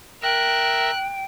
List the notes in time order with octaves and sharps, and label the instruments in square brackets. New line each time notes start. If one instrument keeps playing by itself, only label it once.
[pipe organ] A#4 E5 [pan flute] G5 [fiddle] F#6